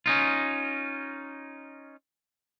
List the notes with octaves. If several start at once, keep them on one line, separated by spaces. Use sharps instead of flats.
C#4 D#4 F4